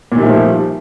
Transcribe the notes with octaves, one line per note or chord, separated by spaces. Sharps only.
A#2 D#3 F3 G3 A3